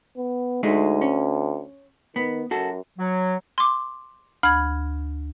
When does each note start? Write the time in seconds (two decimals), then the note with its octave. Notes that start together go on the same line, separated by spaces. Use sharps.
0.17 B3
0.63 D2 G#3 A3 D#4
1.02 C#4
2.16 D#3 B3
2.51 F#2 F#4 A4
2.99 F#3
3.58 C6 D6
4.43 D2 B5 G#6